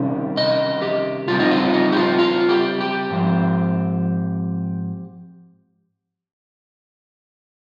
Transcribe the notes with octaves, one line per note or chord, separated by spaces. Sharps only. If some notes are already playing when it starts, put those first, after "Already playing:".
Already playing: C3 D#3 G3 C#4
D#5
G4
C#3 G3 C4 F4
D#4
F4
D#4
G4
F4
F4
G4
G4
G#2 F3 C4